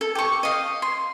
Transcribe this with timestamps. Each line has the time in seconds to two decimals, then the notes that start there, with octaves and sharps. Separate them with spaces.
0.01 A4
0.15 G4 C#6
0.43 D#5 F5
0.82 C6